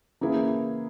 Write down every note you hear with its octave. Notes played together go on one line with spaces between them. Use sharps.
C#3 E3 A#3 E4 G#4